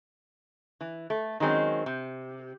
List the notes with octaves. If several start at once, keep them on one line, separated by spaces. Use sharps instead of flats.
E3
A3
D#3 F#3 G#3 C4 C#4
C3